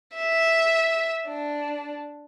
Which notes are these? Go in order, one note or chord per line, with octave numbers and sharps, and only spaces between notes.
E5
D4